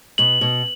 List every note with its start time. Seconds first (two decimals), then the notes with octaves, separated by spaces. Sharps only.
0.18 B2 F#7
0.41 B2